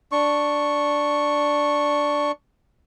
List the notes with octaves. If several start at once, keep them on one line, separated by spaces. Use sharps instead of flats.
D4 C#6